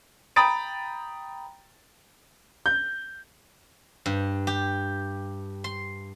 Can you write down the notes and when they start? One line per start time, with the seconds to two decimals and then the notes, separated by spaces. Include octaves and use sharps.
0.36 G5 A#5 B5 D#6 A6 D7
2.66 G6
4.06 G2
4.47 G4
5.64 C6